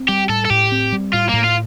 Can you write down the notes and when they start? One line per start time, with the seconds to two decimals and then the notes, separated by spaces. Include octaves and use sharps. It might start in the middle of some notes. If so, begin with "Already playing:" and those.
Already playing: C4
0.08 G3 G4
0.29 A2 A4
0.45 A4
0.50 A2 G4
0.72 C4
0.92 G3
1.13 A2 F4
1.29 A2 A#3
1.44 F4